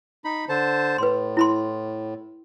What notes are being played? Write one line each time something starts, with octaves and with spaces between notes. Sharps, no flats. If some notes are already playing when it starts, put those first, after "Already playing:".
D#4 B5
D3 C5 A5
A2 B4 C6
E4 B5 C6